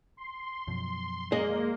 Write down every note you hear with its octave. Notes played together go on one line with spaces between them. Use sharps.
C6
F#2 B2 F3
G#3 A#3 D#5